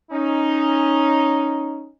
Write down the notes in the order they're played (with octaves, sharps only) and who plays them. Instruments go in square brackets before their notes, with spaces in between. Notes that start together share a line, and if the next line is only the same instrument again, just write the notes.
[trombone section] C#4 D#4